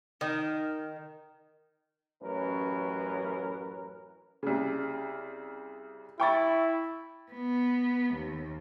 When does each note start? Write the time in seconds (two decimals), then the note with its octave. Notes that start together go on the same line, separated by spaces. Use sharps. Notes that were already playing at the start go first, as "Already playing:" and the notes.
0.21 D#3
2.22 A1 F#2 C#4 A#4 B4
4.43 C2 C#3
6.20 E4 G5 C#6 A6
7.30 B3
8.14 D#2